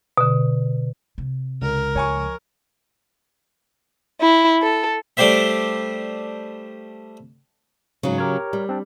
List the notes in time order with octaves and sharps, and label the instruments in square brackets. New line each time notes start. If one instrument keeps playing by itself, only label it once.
[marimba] B2 D3
[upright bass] C3
[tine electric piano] C#2 [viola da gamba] A#4
[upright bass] F3 [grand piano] C#5 G#5 C#6
[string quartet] E4
A4
[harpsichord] G3 A3 D4 G4 C5 E5
[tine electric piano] G#2 [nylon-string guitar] C#3 F#3
[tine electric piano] G4 A#4 C#5
[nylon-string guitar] G3
[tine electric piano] C4 D4